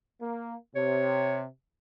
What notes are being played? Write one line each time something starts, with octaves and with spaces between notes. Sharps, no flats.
A#3
C3 C#5